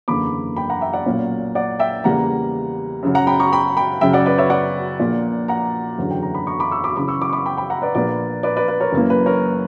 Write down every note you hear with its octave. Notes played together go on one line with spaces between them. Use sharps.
F#1 E2 D3 A#3 B5 D6
G5 B5
F#5 A#5
E5 G5
D5 F#5
B1 A#2 A#3 C#4
D5 F#5
E5 G5
E2 C#3 G3 A#3 F#5 A#5
F#2 C#3 F#3
F#5 A#5
G5 B5
A#5 C#6
G5 B5
G5 B5
F#2 C#3 F#3 E5 G5
D5 F#5
B4 D5
C#5 E5
D5 F#5
A#1 A#2 A#3
F#5 A#5
F#1 E2 D3 F#3
G5
A#5
B5
A#5 C#6
B5 D6
C#6 E6
B5 D6
F#2 C#3 E3 B5 D6
C#6 E6
B5 D6
C#6
B5 D6
G5 B5
G5 B5
F#5 A#5
B4 D5
A#1 A#2 A#3 B4 D5
B4 D5
B4 D5
B4
A#4 C#5
F#1 F#2 E3 A#3
B4
A#4 C#5